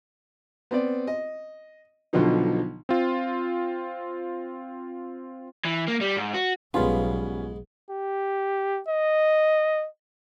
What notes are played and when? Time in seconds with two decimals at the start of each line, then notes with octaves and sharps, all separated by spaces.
0.71 B3 C4 D5
1.07 D#5
2.13 B1 B2 D3 D#3 F3 D#4
2.89 C4 F4
5.65 E3
5.88 A#3
6.01 G3
6.17 G#2
6.34 F#4
6.74 B1 G#2 G3 B3 C#4 F4 B4
7.90 G4
8.88 D#5